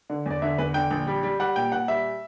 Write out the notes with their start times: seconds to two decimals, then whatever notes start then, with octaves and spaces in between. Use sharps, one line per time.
0.10 D3
0.26 E2 D5
0.42 D3 E5
0.58 E2 B4
0.74 D3 G5
0.91 A#1
1.07 G3
1.23 G3
1.40 G3 F#5
1.56 A#2 G5
1.72 A#2 F#5
1.88 G3 E5